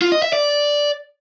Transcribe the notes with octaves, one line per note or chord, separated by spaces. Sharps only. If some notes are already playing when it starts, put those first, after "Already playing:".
F4
D#5
E5
D5